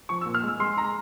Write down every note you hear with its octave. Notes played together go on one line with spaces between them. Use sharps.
F3 C#6
A#2 E6
F6
G#3 E6
G#3 C6
G#3 A#5